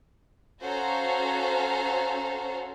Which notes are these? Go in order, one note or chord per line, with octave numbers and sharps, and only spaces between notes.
C#4 F#4 A4 C5 F5 A#5